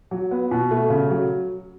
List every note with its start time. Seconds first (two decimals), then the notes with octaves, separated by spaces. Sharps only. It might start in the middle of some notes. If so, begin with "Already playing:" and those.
0.11 F#3
0.31 B3
0.51 B2
0.71 A3
0.90 C#3
1.10 F#3